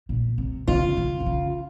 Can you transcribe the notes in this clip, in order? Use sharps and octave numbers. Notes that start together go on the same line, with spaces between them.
A#2
C3
C#3 F4
C#3
C3
C#3